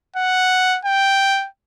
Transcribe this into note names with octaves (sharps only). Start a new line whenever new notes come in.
F#5
G5